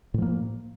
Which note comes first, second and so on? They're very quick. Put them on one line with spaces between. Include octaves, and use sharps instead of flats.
A2 F3 A#3